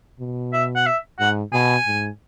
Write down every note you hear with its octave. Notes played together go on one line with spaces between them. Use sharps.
B2
E5
F#5
E5
G#2 F#5
B2 G#5
G#2